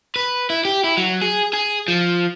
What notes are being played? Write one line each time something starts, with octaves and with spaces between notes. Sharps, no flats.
B4
E4
G4
E4
F#3
G#4
G#4
F3